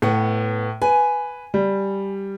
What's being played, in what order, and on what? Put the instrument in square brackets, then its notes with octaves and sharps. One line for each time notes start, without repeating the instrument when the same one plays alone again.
[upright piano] A2 [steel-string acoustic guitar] B3 F#5
[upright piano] B4 [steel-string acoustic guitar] G#5
[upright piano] G3